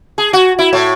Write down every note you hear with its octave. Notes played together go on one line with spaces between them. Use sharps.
G#4
F#4
E4
A2